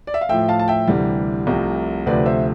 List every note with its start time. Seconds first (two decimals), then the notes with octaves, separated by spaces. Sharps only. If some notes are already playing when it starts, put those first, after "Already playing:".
0.07 D5
0.14 E5
0.21 F5
0.29 A2 F3 A3 E5 G5
0.49 F5 A5
0.59 A5
0.68 E5 G5
0.88 D2 C3 E3 G3
1.47 C2 C3 F3 A3
2.06 D2 C3 F3 A3 B4 D5
2.26 C5 E5